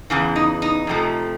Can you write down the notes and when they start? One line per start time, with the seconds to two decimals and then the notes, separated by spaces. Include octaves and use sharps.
0.10 E2 C#3 E3
0.36 D#4
0.62 D#4
0.87 F2 C3 F3 A3